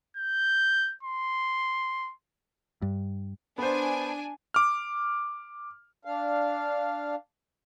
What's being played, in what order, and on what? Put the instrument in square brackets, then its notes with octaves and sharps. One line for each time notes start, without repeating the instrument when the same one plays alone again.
[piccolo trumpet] G6
C6
[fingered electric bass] G2
[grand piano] B3 C5 [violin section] D4 G#5
[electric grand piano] D6 F6
[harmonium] D4 F5